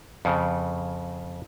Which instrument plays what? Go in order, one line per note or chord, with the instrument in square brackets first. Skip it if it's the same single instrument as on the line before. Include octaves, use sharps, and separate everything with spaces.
[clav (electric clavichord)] F2 C#3